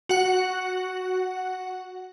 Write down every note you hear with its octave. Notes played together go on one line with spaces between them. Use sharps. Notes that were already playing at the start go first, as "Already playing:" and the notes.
F#4 F#5